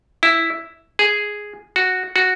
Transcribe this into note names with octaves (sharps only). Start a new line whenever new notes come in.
E4
G#4
F#4
F#4